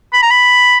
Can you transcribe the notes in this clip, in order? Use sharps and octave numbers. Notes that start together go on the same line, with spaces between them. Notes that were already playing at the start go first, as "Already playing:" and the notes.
B5
A#5
B5